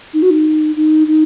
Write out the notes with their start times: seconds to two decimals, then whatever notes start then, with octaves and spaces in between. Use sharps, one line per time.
0.14 D#4
0.22 F#4
0.30 D#4
0.76 D#4
1.07 D#4